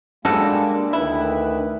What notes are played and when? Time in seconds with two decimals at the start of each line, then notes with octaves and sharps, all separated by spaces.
0.25 C#3 G3 G#3 A#3 D4 F#4 A4
0.93 D2 D#3 E4 B4